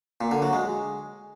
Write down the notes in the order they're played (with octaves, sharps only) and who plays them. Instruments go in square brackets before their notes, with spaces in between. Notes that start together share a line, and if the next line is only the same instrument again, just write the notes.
[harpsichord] A#2
D3
F#3
G#3